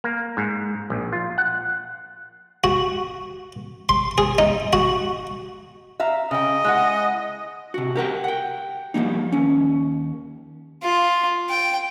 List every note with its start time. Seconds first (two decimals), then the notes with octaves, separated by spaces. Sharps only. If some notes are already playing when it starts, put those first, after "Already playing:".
0.04 A#3
0.37 G#2
0.90 A#1
1.13 F4
1.38 F#5
2.64 F#4
3.89 C6
4.18 G#4
4.38 D#4
4.73 F#4
6.00 E5 F5 A#5
6.31 C#3 D#5 G5
6.64 G#3 E4 F#5
7.74 C3 F#4
7.96 G4 A#4 F#5 G5
8.24 F#5 G5
8.94 F3 G3 A#3 D#4
9.32 D#2 C#4
10.83 F4
11.50 G5